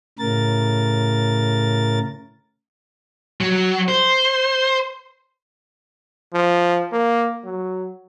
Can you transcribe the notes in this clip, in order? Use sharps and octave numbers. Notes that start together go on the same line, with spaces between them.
A2 C#3 A#4 A6
F#3
C5
F3
A#3
F#3